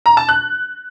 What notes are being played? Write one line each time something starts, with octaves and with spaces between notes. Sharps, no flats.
A#5
A5
F#6